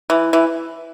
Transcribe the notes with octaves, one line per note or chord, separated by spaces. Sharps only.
E3
E3